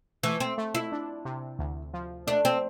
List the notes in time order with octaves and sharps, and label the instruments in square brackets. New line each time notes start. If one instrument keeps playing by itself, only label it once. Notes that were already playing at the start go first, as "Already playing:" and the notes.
[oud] E3 [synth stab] A3
[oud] C4
[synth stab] A3
[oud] E4
[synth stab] D4
C3
D2
F3
[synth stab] A3 [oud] D4
[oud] C4